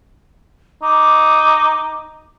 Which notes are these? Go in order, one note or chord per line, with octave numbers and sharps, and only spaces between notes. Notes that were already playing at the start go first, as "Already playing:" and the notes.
D#4 D6